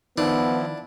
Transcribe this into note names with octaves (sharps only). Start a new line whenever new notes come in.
D#3 F3 B3 D4 E4